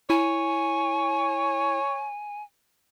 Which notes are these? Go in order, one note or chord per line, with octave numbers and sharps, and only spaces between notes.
E4 C#5 G#5